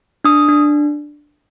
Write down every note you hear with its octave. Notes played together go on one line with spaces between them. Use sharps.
D4 D#6
D4